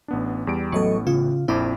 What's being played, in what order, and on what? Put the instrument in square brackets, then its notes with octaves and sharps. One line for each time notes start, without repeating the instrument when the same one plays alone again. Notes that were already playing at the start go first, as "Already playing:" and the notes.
[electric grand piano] A1 B3 D4
E2 G3 D7
[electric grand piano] A1 A2 B3 [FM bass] F#3 [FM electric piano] A4 D#5 C#6
[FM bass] C#3 [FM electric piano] F4
[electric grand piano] A#1 F2 [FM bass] C4 [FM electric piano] E4 B5 D6